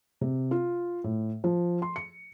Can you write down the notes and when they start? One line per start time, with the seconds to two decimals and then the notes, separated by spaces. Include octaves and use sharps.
0.21 C3
0.51 F4
1.04 A2
1.44 F3
1.82 C6
1.96 C#7